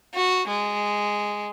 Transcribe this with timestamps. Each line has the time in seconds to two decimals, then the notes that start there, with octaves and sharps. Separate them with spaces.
0.14 F#4
0.48 G#3